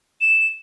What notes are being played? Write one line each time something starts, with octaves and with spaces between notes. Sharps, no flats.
E7